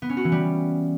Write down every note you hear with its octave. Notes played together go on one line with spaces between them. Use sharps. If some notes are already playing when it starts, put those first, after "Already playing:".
B3
C#4
F#4
E3
G3